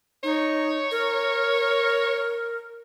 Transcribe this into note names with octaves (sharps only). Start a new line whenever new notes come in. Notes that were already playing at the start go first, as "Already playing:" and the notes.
D#4 C#5
A#4